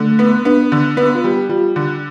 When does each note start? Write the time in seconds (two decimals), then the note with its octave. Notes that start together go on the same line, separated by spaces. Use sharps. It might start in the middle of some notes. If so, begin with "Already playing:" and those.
Already playing: D3 A3
0.19 B3
0.45 B3 D4
0.72 D3
0.97 B3 D4
1.15 F4
1.24 G3
1.32 G4
1.49 G3 F4
1.76 D3